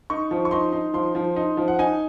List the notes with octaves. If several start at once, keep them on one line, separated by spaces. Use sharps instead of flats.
D#4 C#6
F3
C#6
D#4 C6
D#4
F3 C6
F3
D#4
F3
F#5
D#4 G#5